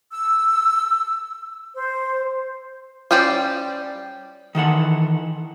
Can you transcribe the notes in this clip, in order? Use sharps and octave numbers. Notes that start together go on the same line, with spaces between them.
E6
C5
G3 C#4 G4 C5 D5
D#3 E3 A4 F#5